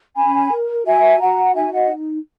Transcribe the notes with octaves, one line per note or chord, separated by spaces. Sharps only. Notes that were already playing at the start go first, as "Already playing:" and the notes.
C#4 G#5 B5
A#4
F#4 E5 G#5
F#4 F#5 A#5
D#4 E5 G#5
D#5 F#5